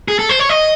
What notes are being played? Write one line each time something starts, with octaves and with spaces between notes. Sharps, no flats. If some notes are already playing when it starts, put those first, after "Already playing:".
G#4
A4
C5
C#5
D#5